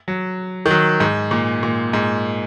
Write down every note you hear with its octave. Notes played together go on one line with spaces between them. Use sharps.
F#3
D#3
F#3
G#2
A#2
A#2
G#2